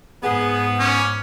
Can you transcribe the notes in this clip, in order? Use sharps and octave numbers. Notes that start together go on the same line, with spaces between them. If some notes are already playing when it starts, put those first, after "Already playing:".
G#2 B3 G#4
C#4 D6